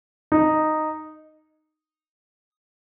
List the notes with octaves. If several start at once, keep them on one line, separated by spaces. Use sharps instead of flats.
D#4